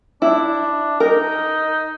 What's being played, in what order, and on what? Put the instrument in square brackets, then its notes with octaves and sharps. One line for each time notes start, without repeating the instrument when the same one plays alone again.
[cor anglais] D4 [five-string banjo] E4
[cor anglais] D#4 [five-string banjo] A#4